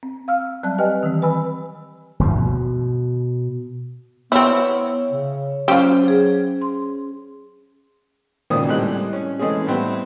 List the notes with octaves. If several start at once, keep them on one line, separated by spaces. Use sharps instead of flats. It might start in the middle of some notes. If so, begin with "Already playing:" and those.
C4
F5 E6 F6
F#3 G3 C4 D5 A5 F#6
G4 B4 D#5 G5 G#5 F6
D#3 E3 C4
B4 G#5 B5 E6
G1 D2 G#2 F3
B2
B3 C4 E4 C#5 E5
C#3
F#3 C#4 F4 G4 C5
G#4
C6
G#1 A#2 C#3 A#3 D5 D#6
A2 G3 G#3 C4 F#6
C#4
E3 G#3 A3 C4 C#4 G#4
A2 G3 B3 C4 E4